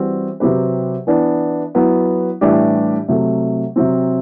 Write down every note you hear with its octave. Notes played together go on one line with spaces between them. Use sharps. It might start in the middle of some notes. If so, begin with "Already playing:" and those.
Already playing: E3 G3 C4 F#4
C3 F#3 C4 G4 B4
E3 B3 D4
F#3 B3 E4
A2 E3 G3 D4 G4
C3 F#3 A3
C3 F#3 C4